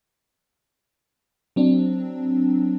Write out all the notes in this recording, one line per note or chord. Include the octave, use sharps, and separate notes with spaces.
F#3 C4 D4